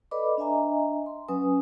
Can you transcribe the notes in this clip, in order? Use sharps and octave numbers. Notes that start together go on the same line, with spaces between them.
A4 B4 D5 D#5 B5 D6
D4 D#5 E5 G#5 A#5
C6
F#3 C#4 B4 G#5 D#6